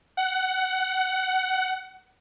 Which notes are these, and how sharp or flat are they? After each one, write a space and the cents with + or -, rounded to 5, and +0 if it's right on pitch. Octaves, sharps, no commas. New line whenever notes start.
F#5 +15